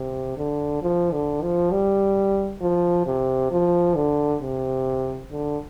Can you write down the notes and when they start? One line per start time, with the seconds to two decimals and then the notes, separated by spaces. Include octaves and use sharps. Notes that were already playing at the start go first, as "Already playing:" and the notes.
Already playing: C3
0.38 D3
0.82 F3
1.12 D3
1.42 F3
1.71 G3
2.61 F3
3.07 C3
3.51 F3
3.95 D3
4.41 C3
5.31 D3